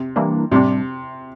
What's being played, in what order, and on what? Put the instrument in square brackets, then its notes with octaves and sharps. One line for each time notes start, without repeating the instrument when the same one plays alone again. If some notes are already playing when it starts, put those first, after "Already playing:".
Already playing: [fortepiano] C3
[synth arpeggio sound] E3 G3 A#3 D4
[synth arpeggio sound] A2 G3 D4 [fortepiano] C3